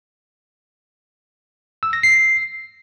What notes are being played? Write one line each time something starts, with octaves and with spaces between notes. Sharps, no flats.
E6
A#6
C7